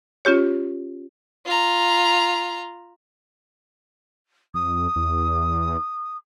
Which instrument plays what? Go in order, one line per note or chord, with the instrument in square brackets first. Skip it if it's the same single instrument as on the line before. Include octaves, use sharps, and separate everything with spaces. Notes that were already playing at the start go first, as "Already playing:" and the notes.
[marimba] C#4 F4 G4 C#5
[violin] F4 A#5
[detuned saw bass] F2 [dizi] D#6
[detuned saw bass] E2